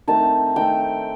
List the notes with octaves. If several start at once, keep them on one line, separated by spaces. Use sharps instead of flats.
D#3 A3 C4 A5
D#3 A3 C4 G5